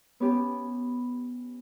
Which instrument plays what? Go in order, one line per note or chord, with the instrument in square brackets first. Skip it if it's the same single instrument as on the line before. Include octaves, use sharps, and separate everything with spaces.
[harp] B3 C#4 G4